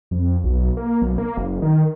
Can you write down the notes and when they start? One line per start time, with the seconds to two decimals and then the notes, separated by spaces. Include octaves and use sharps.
0.11 F2
0.44 B1
0.77 A#3
1.02 B1
1.18 A#3
1.37 F#1
1.62 D#3